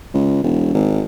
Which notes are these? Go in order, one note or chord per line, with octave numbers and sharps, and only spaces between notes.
C#2
E1
G#1